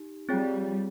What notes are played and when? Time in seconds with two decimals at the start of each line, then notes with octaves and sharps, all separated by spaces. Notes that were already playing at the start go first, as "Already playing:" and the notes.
Already playing: D#4 G4
0.29 G3 C4 F4 G#4 C#5 G5